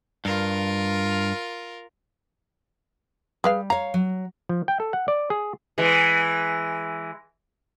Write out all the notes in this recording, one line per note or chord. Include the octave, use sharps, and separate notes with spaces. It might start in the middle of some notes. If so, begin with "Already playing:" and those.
G2 F4 A#4
G3 G#4 B4 F5
C#5 F5 A#5
F#3
F3
G5
A4
F#5
D5
G#4
E3 G#3